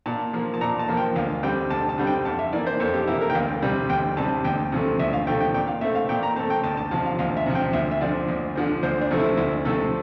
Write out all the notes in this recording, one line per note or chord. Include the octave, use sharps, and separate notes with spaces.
A#2 A5
F3 A#3
A5
A#2 A#5
A5
F3 A#3
G5
D2 F5
D3 G3 C4 G5
D2 A5
A5
D3 G3 C4
G5
F2 A5
E5
E3 A#3 D5
C5
F2 A4
G4
E3 A#3 E4
A#4
G5
D2 F5
C3 G3 C4
D2 G5
C3 G3 C4 A5
D2 G5
C3 F3 A3
D2 E5
F5
C3 F3 A3 G5
G5
A#2 G5
F5
A3 C4 E5
F5
A#2 G5
A#5
A3 C4 A5
G5
D2 A5
A5
C3 F3 A5
F5
D2 F5
E5
C3 F3
G5
D2 E5
E5
D3 F3 C4 D5
D2
D3 F3 C4
D2 C5
D4
C3 F3 A3 C4
E4
D2 E4
C3 F3 A3 C4 A4